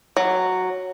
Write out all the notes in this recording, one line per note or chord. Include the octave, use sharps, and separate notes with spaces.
F#3